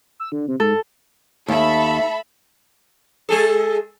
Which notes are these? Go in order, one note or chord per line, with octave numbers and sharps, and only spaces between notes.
E6
D3
C3
G#2 A4
D#2 A4 E5 B5
G#3 G#4 A4